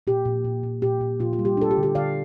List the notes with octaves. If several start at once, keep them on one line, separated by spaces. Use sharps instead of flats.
A#2 G4
A#2
A#2
A#2
A#2 G4
A#2
A#2 F4
F4
G3
G4
D4 A4
G4
D3
G4
D3 D5 F5